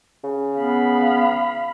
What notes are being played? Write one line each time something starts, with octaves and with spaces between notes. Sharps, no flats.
C#3
B3 F5 B5